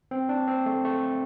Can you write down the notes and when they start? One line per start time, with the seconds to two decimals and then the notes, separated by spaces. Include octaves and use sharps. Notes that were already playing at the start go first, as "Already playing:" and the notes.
0.11 C4
0.29 D4
0.48 C4
0.66 A3
0.85 A3